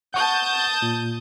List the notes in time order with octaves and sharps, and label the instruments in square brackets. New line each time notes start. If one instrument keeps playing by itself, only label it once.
[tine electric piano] F#5 C#6 [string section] A5 D#6 G6
[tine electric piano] A#2